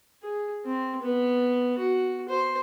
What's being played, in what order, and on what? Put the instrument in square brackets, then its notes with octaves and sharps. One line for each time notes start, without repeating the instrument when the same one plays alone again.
[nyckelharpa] G#4
C4
B3
F#4
C5